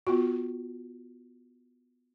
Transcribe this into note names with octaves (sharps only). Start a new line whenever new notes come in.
B3 F4 F#4